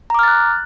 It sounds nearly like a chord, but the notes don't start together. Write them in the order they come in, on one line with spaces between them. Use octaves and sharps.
A#5 D6 F6 A6 F#6